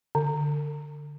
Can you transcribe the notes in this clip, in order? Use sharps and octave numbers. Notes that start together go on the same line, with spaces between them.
D3